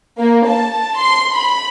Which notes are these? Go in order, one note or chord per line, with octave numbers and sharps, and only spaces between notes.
A#3
A5
C6
B5